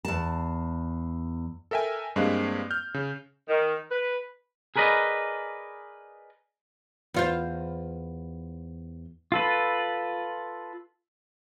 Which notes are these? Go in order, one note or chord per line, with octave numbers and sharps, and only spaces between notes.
E2 A5
A4 A#4 E5 G5 G#5
G2 G#3 A#3 C4 F5 F#6
F6 G6
C#3
D#3
B4
G#4 A#4 B4 D5 D#5
E2 F4 C5
F4 A4 B4